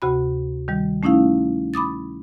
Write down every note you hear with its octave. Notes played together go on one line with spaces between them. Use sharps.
D2 C3 F#4 B5
D#3 G3
A3 C#4 D#4 E4 F5
B5 D6 D#6 A6